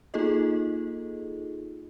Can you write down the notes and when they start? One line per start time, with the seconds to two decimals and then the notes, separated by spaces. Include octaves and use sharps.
0.14 A#3 D#4 F4 G#4 A4 D#5